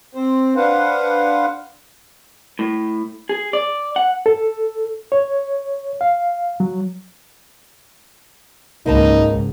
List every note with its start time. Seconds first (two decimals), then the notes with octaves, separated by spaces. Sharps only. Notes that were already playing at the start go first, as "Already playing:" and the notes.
0.15 C4 C5
0.56 D4 B4 C5 F5 F#5
2.59 A2
3.29 G#4
3.53 D5
3.96 F#5
4.26 A4
5.12 C#5
6.01 F5
6.60 F#3
8.86 C#2 G#2 A#3 D#4 B4 A5